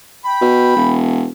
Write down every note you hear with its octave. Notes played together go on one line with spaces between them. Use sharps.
G5 B5
B2
E1